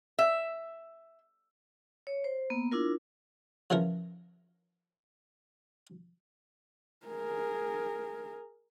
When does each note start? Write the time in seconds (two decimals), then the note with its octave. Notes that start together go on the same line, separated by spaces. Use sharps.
0.19 E5
2.07 C#5
2.24 C5
2.50 A#3 B3
2.72 D4 E4 F4 A#4
3.70 C#3 E3 F3 C#4 A#4
7.06 G#4 A#4